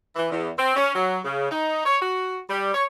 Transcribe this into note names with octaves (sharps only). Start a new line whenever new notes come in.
E3
E2
C4
C#4
F#3
C#3
D#4
C#5
F#4
G3
C#5